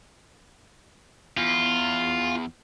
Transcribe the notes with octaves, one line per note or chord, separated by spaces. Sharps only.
E2 F4